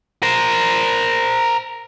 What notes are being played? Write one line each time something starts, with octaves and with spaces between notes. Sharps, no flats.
A#4 C5